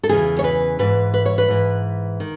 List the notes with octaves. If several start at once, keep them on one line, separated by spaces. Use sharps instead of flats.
A4
E2 C#3 E3 G#4
C#5
B4
G#2 E3 B4
B4
C#5
B4
G#2 E3
D#3